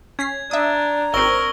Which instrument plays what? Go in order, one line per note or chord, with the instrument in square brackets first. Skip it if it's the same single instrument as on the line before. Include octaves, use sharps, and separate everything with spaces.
[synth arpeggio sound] C#4 B6 C7 [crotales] G#6
[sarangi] D4 [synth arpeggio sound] E5 D#6 [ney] A#5
[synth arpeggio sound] G#1 C4 [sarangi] A#4 [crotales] C#6 E6 G7